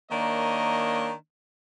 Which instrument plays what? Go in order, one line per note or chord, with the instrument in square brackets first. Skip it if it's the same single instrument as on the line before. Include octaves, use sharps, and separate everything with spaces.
[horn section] D#3 A#3 D4 C#5 D#5